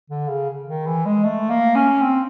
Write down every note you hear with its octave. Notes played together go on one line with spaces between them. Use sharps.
D3
C#3
D#3
E3
G#3
A3
A#3
C#4
C4